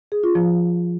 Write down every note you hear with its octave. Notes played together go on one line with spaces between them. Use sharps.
G#4
F4
F3